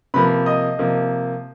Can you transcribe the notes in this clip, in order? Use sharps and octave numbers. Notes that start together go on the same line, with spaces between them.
C3 F3 A#3 B4 B5
D#5 D#6
C3 F3 A#3